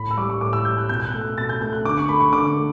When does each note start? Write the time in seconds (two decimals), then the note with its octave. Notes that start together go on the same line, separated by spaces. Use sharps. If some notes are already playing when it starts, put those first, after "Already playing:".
Already playing: A2 B5
0.11 E6
0.17 G3 D6
0.29 C#6
0.41 A2 D6
0.53 E6
0.65 G3 G6
0.78 F#6
0.89 B2 G6
1.00 G6
1.05 F#6
1.14 A3
1.21 F#6
1.37 B2 A6
1.49 G6
1.61 A3 G6
1.73 F#6
1.85 D3 D6
1.97 C#6
2.09 A3 B5
2.20 C#6
2.33 D3 D6
2.57 A3